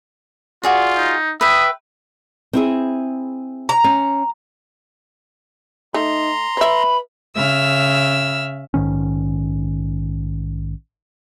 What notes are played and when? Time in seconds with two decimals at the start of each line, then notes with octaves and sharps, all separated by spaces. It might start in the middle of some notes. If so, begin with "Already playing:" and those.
0.63 F4 F#4 G#4 D5
0.97 D#4
1.41 B4 E5 G5 D#6
2.53 C4 E4 G#4
3.69 A#5
3.84 C#4
5.94 A3 D#4 A#5 C6
6.57 B4 C#5 E5 B5
7.34 C#3 E5 E6 F6
8.74 A#1 G#2 D#3 C#4